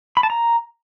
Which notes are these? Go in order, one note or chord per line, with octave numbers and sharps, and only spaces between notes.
B5
A5
A#5